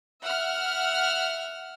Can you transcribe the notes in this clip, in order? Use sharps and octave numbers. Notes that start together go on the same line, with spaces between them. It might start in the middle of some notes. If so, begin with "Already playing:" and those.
E5 F#5 F6